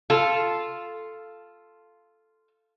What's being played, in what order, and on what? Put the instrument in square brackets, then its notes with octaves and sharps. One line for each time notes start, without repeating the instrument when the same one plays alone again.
[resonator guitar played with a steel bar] F4 A4